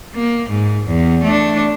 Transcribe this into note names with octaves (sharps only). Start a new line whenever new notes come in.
A#3
G#2
E2
A3 D4